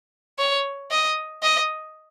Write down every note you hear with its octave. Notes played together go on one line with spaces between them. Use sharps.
C#5
D#5
D#5